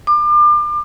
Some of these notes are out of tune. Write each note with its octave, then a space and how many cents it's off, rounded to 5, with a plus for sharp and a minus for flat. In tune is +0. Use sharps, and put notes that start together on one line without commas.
D6 +35